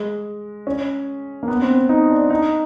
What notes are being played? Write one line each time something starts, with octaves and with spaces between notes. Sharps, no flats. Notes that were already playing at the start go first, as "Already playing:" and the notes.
Already playing: G#3
C#4
A#3
B3
C4
D#4
D4
D#4